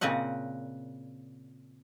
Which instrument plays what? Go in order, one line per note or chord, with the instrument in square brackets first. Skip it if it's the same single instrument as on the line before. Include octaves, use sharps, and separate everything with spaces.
[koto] A#2 C#3 C4 D#5 F#5